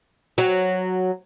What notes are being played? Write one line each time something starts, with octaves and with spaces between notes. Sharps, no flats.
F#3